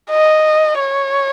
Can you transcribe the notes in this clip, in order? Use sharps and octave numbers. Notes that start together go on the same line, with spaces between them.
D#5
C#5